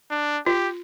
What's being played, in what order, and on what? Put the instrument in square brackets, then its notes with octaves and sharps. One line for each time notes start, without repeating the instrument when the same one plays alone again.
[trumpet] D4
[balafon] F4 [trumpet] G4